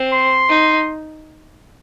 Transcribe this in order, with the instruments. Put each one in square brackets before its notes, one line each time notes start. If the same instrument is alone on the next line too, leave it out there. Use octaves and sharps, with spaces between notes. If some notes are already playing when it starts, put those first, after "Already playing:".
Already playing: [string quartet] C4
[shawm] C6
[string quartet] D#4